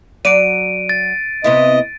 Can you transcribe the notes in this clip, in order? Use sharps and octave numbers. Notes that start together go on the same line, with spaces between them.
F#3 D5 D7 D#7
A6
C3 B3 E4 D#5